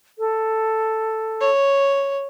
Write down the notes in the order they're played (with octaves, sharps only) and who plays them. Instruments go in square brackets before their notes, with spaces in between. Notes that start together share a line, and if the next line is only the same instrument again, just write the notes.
[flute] A4
[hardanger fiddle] C#5